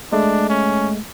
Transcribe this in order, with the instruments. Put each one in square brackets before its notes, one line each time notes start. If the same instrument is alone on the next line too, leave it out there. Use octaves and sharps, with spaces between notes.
[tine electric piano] G#3 A3 [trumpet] D4
[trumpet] C#4